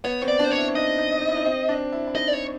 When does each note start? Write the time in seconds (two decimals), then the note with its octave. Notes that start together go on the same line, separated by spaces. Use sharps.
0.04 B3 C#5
0.22 C4
0.28 D5
0.39 D4
0.44 C5
0.51 C#5
0.58 E4
0.75 D#4 D#5
0.98 D#4
1.21 D#4
1.29 E4
1.36 D#4
1.45 C4
1.69 D4
1.92 E4
2.07 E4
2.15 D#4 D#5
2.28 D5
2.33 C#5